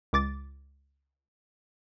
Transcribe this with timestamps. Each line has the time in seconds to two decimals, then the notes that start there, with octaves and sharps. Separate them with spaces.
0.13 C#2 D6 A6